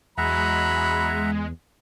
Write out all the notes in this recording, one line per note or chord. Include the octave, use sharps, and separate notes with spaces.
E2 F#3 G#3 E5 F#5 A#5 B5